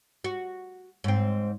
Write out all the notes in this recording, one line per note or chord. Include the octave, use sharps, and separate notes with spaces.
F#4
G#2 C4